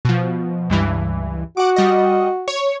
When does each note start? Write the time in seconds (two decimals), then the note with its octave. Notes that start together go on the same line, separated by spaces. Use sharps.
0.05 B2 F3
0.70 C#2 G2 E3
1.57 F#4 F#5 D6
1.76 G3 D#5
2.48 C#5